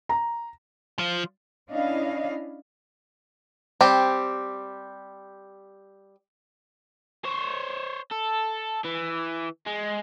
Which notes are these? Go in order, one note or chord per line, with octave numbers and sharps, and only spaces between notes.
A#5
F3
C#4 D4 E4 D#5 F5
G3 C4 G4
C5 C#5
A4
E3
G#3